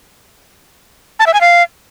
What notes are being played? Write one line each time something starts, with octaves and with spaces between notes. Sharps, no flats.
A5
E5
G#5
F5